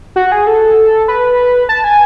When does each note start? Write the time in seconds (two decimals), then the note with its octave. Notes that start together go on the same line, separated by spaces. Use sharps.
0.16 F#4
0.32 G#4
0.47 A4
1.08 B4
1.69 A5
1.84 G#5